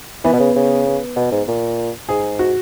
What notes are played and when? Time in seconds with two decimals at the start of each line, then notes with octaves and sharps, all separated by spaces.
0.24 E3 B3
0.33 B2
0.39 C#3
0.56 C#3
0.86 B3
1.16 B2
1.31 G#2
1.48 A#2
2.09 G#2 G#4
2.39 F#4